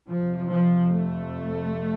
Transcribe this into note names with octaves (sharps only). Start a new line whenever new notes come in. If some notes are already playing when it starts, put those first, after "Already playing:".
F2 C3 F3
F3
A3